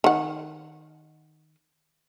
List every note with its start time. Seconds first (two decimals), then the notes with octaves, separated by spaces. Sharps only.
0.04 D#3 F#5